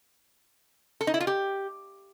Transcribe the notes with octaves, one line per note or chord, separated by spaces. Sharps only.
A4
D#4
E4
F4
G4